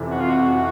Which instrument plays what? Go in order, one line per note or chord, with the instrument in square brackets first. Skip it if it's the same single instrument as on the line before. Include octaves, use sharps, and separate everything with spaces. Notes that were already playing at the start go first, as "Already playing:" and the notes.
Already playing: [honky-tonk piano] F2 C3 E3
[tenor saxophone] F#4
F4
F#4
F#4